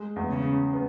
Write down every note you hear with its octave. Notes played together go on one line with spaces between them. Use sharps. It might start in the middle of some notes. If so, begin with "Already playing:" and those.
Already playing: G#3
E2
C#3
C#3
B3